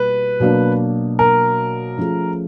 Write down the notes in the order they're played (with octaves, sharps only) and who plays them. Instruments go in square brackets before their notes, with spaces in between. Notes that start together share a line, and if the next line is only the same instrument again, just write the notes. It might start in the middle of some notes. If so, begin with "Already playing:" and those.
Already playing: [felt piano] B2 G3 A#3 [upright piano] B4
[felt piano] B2 F#3 A#3 D4
[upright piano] A#4
[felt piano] F3 A3 C#4 F4 G#4